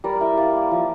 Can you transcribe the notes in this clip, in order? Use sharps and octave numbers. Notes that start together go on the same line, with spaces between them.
G3 A#4 D5
E4 E5 G5
G3 D5 F5
A#3
F3